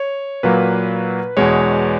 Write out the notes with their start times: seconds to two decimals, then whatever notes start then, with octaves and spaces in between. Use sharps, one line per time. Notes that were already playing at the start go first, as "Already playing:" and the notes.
Already playing: C#5
0.43 A#2 F#3 A#3 B4
1.37 E2 B2 G#3 C#5